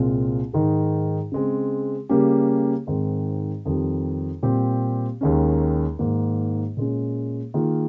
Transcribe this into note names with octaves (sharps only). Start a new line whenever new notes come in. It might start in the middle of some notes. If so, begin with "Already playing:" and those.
Already playing: C2 A#2 G#3 C4 F4
G#2 D#3 G#3 D#4 G#4
C#3 G#3 C4
C#3 G3 A#3 C#4 G4
G#2 D#3 G#3 C4
F2 D#3 G3
A#2 G3 C4 G4
D#2 D#3 G#3 C#4
G#2 D#3 A#3
A#2 G#3 C#4
D#3 A#3 F4 G#4